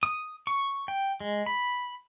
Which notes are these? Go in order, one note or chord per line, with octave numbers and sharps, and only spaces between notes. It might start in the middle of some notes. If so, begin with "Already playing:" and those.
D#6
C#6
G5
G#3
B5